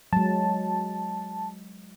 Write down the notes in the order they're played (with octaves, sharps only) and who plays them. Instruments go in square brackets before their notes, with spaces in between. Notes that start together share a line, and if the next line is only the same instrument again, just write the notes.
[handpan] F#3 G#3 [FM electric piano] A5